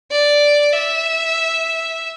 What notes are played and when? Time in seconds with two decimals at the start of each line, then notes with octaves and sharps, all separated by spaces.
0.11 D5
0.73 E5